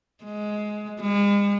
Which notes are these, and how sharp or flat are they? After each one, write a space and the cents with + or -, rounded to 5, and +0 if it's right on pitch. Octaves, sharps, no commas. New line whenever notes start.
G#3 +15
G#3 -40